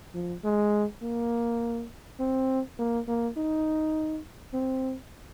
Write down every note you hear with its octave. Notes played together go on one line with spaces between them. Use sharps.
F3
G#3
A#3
C4
A#3
A#3
D#4
C4